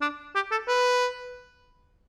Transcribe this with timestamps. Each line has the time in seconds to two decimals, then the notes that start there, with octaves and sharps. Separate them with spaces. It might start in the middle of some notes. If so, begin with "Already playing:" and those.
0.01 D4
0.35 G4
0.51 A4
0.68 B4